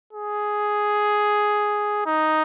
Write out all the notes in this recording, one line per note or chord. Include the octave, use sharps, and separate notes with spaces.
G#4
D#4